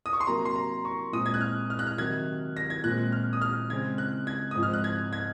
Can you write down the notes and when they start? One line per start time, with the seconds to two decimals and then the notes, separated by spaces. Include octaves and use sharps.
0.06 D#6
0.13 C#6
0.20 C6
0.27 C3 F#3 A#3 A#5
0.45 C6
0.56 A#5
0.85 C#6
1.12 A#2 G#3 C4 D#6
1.26 G#6
1.34 F#6
1.41 F6
1.70 F6
1.79 F#6
1.87 F6
1.98 C3 D#3 F#3 G#6
2.57 A#6
2.70 G#6
2.84 A#2 G#3 C4 F#6
3.12 F6
3.33 D#6
3.41 F6
3.70 C#3 G#3 C4 G#6
3.98 F#6
4.27 G#6
4.51 G#2 F3 G#3 C4 D#6
4.63 F6
4.73 F#6
4.84 G#6
5.13 G#6